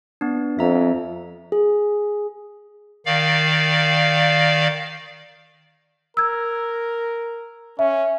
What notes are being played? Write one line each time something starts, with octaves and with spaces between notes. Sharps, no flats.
B3 D4
F2 E5 A#5
G#4
D#3 D5 F5
A#4 E6 G#6
C#4 E5